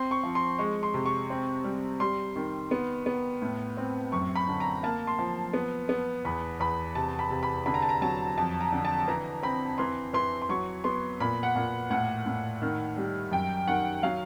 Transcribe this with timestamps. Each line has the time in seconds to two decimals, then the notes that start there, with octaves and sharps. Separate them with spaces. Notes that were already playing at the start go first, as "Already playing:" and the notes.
Already playing: C4 C6
0.11 C#6
0.23 F3
0.35 C6
0.59 G#3 C#6
0.83 C6
0.94 C3
1.06 C#6
1.30 C4
1.64 G3
2.00 G3 C6
2.36 D#3
2.71 B3
3.06 B3
3.42 A2
3.77 C4
4.12 F#2 C#6
4.36 B5
4.48 D3
4.60 A#5
4.83 A#3 A5
5.07 C6
5.19 F3
5.53 B3
5.89 B3
6.25 E2 B5
6.60 E2 B5
6.95 C3 A5
7.19 B5
7.30 C3
7.43 B5
7.66 D3 B5
7.74 A#5
7.82 A5
7.89 A#5
8.01 F#3 A5
8.38 F2 A5
8.61 A#5
8.72 D3
8.85 A5
9.08 E3 A#5
9.43 C4 B5
9.78 E3 C6
10.14 E3 C6
10.42 C6
10.49 F#3 C#6
10.84 B3 C6
11.20 A#2 B5
11.43 F#5
11.56 A#2
11.90 A2 F#5
12.26 A2
12.62 D#3
12.96 G3
13.32 F#2 G5
13.67 D#3 F#5
14.03 F#3 F5